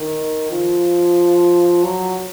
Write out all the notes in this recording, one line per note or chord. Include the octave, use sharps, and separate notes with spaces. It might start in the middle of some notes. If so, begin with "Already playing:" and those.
Already playing: D#3
F3
F#3